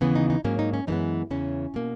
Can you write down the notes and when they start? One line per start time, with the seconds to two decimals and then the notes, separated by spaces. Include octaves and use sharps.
0.01 D#2 C#3 E3 B3
0.15 D#4
0.30 D#4
0.44 G#2 F#3 A#3 C#4
0.59 D#4
0.74 C#4
0.87 F#2 E3 G#3 B3 D#4
1.31 E2 C#3 E3 C#4
1.74 B2 A#3